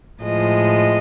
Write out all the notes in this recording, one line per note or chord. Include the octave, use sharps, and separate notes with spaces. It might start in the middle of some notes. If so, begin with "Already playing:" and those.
A2 F3 G#3 D#5